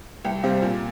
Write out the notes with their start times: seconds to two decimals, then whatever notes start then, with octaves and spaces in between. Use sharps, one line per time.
0.25 C2 G5
0.43 C3 G3 C4 F5
0.62 A#2